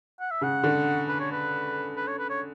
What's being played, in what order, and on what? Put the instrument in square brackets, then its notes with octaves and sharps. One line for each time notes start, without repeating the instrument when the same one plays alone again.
[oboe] F#5
E5
[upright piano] C#3 [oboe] F#5
[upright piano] D3
[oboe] B4
C#5
B4
B4
C#5
B4
C#5